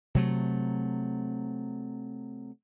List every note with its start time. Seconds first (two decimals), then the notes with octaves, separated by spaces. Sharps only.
0.15 C3 F#3 A3